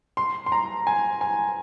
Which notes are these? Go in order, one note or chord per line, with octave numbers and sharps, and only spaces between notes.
C6
C6
A#5
G#5
G#5